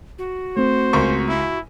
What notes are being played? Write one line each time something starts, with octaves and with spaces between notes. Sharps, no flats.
F#4
A3 C4 C5
C#2 A#4 C#6
E4